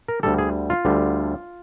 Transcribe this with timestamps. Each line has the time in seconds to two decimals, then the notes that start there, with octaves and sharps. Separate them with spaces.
0.08 A#4
0.23 D2 D3 G3 A4
0.38 G#4
0.70 F4
0.85 D2 D3 G3